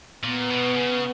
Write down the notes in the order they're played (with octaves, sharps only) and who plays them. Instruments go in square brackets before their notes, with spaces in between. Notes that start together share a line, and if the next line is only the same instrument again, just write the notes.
[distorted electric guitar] A#2 [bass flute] B3
[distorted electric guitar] B2
C#3